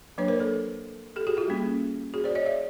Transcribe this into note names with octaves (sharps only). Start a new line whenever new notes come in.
F#3 A#3 D4 B4 C#5
A#4 C5
A4 B4
G4 A4
F#4 G#4
F4 G4
G3 A#3 C#4
F#4 G#4
C5 D5
C#5 D#5
D5 E5